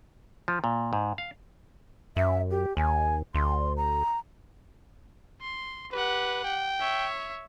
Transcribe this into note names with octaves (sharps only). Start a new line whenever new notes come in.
F3
A#2
G#2
F5
F#2 E5
G4
D#2 G#5
D2 C6
A#5
C6
G4 B4 F#5
G5
C#5 E5